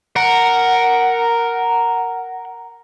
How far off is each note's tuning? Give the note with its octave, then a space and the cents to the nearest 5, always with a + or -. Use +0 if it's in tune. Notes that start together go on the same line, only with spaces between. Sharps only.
A#4 +0 F#5 +5